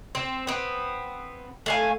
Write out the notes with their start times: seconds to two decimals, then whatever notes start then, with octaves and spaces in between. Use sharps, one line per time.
0.15 C4
0.47 B3 C4
1.66 A3 F5 G#5